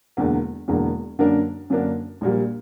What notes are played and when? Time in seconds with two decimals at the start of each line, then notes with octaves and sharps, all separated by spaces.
0.17 E1 E2 D3 A#3
0.68 E1 E2 D3 A#3
1.19 F#2 D3 A#3 D4 A#4
1.70 F#2 D3 A#3 D4 A#4
2.21 A#1 A#2 G3 A#3